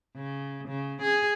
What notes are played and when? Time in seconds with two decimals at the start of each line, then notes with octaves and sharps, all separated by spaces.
0.15 C#3
0.68 C#3
1.02 G#4